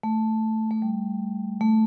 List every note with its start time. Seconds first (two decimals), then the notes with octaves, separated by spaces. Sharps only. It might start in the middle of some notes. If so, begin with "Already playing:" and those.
0.03 A3
0.71 A3
0.82 G3
1.61 A3